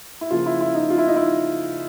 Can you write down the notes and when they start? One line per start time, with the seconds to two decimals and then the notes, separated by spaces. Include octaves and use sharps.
0.21 E4
0.31 C#3 F3 A#3 F4
0.46 E4
0.61 E4
0.74 D#4
0.90 F4
0.98 E4
1.08 D#4
1.16 E4